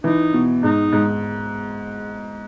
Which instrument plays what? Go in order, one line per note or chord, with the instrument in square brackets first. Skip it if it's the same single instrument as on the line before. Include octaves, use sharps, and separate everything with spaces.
[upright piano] E3 [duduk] D#4
[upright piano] B2
[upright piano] G#2 [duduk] D#4
[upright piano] G#2